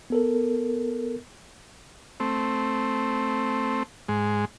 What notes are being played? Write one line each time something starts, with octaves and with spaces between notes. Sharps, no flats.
B3 A4 A#4
A3 C4
G#2 G#3